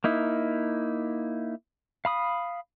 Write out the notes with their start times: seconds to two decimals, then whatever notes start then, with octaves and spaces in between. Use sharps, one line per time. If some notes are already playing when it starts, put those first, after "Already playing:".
0.04 A#3 D#4 E4
2.05 F5 B5 D#6